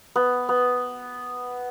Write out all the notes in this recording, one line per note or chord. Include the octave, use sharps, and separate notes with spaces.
B3
B3